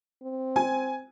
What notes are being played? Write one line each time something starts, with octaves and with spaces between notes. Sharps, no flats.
C4
G#5